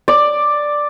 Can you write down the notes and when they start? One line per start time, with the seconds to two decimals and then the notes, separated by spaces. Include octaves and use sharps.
0.08 D5